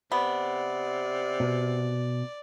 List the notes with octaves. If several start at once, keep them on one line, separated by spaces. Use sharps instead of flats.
C3 B3 D5
B2